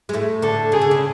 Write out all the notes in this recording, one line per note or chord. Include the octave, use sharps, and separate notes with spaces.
G#3
A2 A3
D2 D3 A4
C#3 G#4
D3
C#3